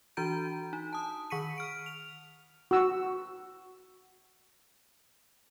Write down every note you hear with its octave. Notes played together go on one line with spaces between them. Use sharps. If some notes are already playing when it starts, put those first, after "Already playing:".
E3 D4 F#4 A#5 G6 D7
D#4
A5 D#6
D#3 C#6 B6 C#7 D#7
F6 D7
F7
F#4 E6